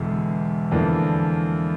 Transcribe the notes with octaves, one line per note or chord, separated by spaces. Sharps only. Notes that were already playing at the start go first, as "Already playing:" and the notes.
Already playing: E1 E2 D3
E2 D3 F3 A#3 D4